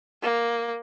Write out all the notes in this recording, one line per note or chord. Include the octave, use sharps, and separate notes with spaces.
A#3